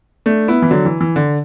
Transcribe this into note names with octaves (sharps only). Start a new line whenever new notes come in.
A3 D4
B3 E4
E3
D3 F#3
E3
E3
D3